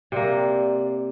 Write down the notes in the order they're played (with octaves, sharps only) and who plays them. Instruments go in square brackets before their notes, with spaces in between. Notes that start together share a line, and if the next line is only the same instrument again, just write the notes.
[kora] C3 A#3 [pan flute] D5